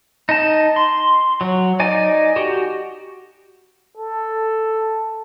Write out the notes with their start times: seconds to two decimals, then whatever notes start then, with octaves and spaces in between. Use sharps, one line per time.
0.29 D#4 A5
0.76 C6
1.41 F#3
1.80 D#4 D5 G#5
2.36 F#4 G4
3.97 A4